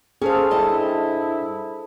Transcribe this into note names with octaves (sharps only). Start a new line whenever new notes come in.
C#4 G#4 A4 C5 F5
G2 E4 D#5 A5